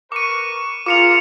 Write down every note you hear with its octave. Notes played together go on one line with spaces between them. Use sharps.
A#4 B4 C#6 D6 D#7
F4 G#4 A#4 D6 C#7 F7